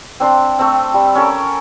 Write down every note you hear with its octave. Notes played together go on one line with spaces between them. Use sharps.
C4 D4 C6
A3 C4
G3
C#4 A4 A#4